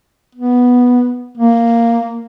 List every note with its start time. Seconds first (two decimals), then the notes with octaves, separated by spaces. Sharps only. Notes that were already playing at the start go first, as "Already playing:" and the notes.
0.35 B3
1.38 A#3